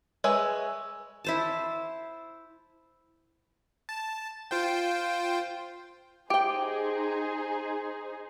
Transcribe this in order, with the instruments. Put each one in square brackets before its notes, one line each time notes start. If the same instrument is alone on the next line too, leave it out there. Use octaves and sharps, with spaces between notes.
[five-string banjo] G#3 B4 C#5 E5
[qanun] E4 C5 A5
[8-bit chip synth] A5
F4 C5 G5
[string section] D#4 G#4 C5 [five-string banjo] G4 G5